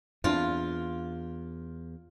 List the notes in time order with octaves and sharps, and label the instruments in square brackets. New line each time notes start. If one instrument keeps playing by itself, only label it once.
[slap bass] E2 [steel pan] C4 D4 E4 [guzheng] F4